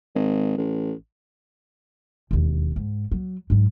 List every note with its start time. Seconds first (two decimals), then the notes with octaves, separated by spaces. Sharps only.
0.15 G#1
0.58 A1
2.31 E1 D#2
2.76 G#2
3.12 F#3
3.50 G#2 F#3